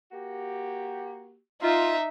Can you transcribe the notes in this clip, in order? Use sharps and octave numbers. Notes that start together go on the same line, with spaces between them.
A#3 F#4 G4
D#4 F4 E5